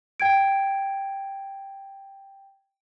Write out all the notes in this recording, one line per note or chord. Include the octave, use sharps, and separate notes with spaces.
G5 G#6 D7